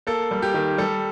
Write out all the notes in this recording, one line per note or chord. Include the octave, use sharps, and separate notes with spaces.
A#3 A4
G3
G4
D#3
G3 A4